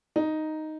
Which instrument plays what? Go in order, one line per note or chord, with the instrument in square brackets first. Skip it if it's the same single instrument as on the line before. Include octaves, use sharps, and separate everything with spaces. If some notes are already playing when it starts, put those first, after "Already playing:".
[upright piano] D#4